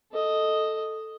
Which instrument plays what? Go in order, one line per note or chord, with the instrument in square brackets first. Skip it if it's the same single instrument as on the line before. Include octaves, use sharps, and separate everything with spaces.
[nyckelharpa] A4 D#5